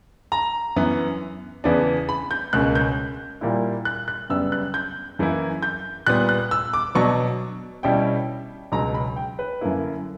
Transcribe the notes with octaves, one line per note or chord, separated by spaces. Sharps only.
A#5
F#2 E3 B3
E2 C#3 E3 B3 D4
B5
G6
C#2 B2 A#3 C#4 F#6
G6
A#2 G3 A#3 E4
F#6
F#6
F#2 C#3 G3 B3 E6
F#6
G6
F#2 E3 A#3 E4
G6
A#2 G3 B3 F#6
F#6
E6
D6
B2 F#3 B3 D4 C#6
B2 G3 C#4 E4 G5
C#2 B2 F#3 A#5
B5
G5
B4
F#2 D3 A#3 E4